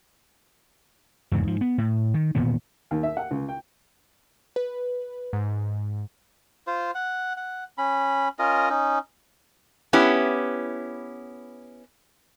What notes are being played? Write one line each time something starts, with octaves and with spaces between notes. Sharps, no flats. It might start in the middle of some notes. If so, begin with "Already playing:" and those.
E2 G#2 C#3
G#2 F3
B3
A2
D#3
E1 A#2 D#3 B3
D#2
E5
F#5
C#2
G5
B4
G#2
F4 C5
F#5
F#5
C#4 B5
C#4 F4 A#4 D#5
C#4 D#4
B3 C#4 E4 G4